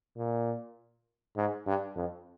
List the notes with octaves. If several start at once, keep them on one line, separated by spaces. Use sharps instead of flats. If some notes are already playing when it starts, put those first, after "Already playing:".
A#2
G#2
G2
F2